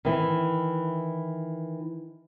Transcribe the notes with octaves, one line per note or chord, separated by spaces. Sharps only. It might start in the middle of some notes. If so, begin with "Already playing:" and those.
D#3 E3